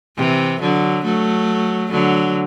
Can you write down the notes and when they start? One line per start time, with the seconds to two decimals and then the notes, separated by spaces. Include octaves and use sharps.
0.17 C3 E3
0.61 D3 F#3
1.05 F#3 A3
1.91 D3 F#3